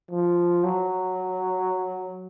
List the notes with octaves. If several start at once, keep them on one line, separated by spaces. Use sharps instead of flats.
F3
F#3